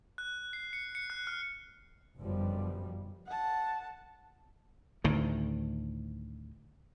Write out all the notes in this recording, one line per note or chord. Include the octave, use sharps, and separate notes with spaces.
F#6
C7
C#7
C#7
F#6
F6
G1 F#2 B2 F3 G3
F#5 A5
D2 A2 D#3